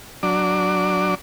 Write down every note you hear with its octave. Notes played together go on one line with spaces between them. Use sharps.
F#3 D4 D6